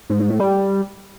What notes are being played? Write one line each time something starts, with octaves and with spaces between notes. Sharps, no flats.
G#2
G#2
A2
G3